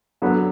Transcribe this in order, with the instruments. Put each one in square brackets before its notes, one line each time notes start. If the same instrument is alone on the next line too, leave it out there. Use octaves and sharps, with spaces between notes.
[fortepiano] F#2 D3 F#3 B3